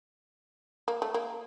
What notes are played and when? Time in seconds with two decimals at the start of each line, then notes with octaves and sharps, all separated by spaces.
0.88 A#3
1.02 A3
1.14 A#3